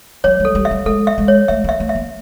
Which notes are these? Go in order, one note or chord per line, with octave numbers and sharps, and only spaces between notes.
F#3 C#5
G3 A4
G3
E5
G3
G#3 A4
E5
G#3
C#5
A3 E5
A#3 E5
A3
E5
A#3